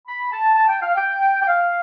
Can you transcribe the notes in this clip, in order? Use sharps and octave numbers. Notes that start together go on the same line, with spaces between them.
B5
A5
A5
G5
F5
G5
G5
F5